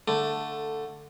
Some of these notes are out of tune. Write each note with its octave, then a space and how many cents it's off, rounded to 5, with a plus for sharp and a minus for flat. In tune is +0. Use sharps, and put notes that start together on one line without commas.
D3 +0 A3 +10